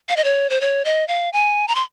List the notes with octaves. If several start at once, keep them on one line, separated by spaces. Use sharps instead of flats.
F5
D#5
C#5
C5
C#5
D#5
F5
G#5
A#5
C6